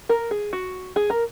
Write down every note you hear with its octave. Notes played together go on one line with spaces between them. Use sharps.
A#4
G#4
F#4
G#4
A#4